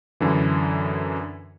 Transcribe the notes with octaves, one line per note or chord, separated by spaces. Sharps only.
F#2 D3 E3